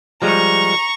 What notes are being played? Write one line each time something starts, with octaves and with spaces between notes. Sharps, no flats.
F3 G3 G#3 A#5 C#6